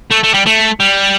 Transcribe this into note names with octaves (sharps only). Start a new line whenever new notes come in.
A3
A3
G3
A3
G3